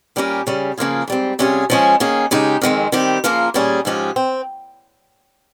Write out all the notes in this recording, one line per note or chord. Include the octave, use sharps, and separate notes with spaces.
A#2 G3 C#4 G4 A#4
C#3 G3 C#4
C#3 F3 A#3 F4 G#4
G#2 G3 C4
C3 G3 C#4 F4 G#4
F3 G#3 C#4 G#4
D#3 A#3 C#4 G#4
C#3 G#3 D#4 G4
F2 D#3 G#3 C4
D#3 G3 C4 G4
C#3 F3 A#3 F4 A#4
A#2 G3 C#4 G#4
G#2 F3 G#3 C#4 G4
C4